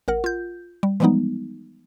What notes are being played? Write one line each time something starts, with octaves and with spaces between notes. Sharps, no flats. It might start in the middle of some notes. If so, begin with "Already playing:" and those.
A1 A#4 F#5
F4 G6
G3
E3 F3 G3 G#3 B3 D#4